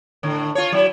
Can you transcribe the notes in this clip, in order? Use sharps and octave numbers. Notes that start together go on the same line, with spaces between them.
A2 D3
F4 C#5
F#3 E4